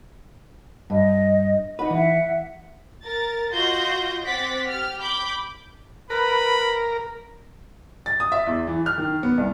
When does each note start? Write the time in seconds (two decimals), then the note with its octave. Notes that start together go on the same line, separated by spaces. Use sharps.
0.90 G2 D#5
1.79 D#4 B4 F#5
1.90 E3 E5 F#5
3.03 A#4 A6
3.50 F4 F#4 D#5 C6 G6 A#6
4.24 C4 F#5 D6 A6 B6
4.67 G4 F6
5.00 B5 D6 G6
6.10 A#4 B4 B5
8.06 A6
8.20 D#6
8.32 E5
8.47 E2
8.67 E3
8.86 F6
8.98 D#3
9.23 B3
9.38 C2